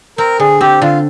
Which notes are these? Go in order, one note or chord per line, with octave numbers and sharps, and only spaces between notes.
C4 A#4
D3 G#4
C4 G4
D3 F4